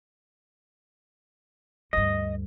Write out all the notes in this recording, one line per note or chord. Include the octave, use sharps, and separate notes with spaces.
D2 G2 D#5